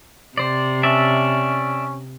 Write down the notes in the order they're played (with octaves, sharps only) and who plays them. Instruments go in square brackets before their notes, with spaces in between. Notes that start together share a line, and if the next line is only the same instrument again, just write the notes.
[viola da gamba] C3 [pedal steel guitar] C5 D5
[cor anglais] C#4 [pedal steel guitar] D5 E5 A5